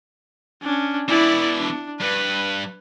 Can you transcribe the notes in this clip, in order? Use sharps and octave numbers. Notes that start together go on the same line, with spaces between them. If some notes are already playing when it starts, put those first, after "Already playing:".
C#4 D4
B2 E3 E4 D5
D4
G2 B4